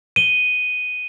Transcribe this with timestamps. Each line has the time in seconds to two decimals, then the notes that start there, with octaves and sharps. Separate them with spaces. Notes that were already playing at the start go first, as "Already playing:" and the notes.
0.16 D#7 G7